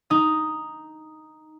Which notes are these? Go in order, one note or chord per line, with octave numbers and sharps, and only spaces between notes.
D#4 D#6